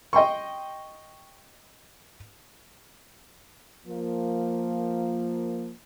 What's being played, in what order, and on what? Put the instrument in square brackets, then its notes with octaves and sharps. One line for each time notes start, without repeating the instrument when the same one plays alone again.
[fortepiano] D#5 G5 C6 C#6
[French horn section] F3 A#3